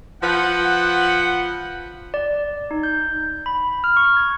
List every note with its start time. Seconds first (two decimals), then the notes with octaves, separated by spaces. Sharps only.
0.23 F3 B4 F#5
2.14 D5
2.71 D#4
2.83 G6
3.46 B5
3.84 F6
3.97 C#6
4.17 G#6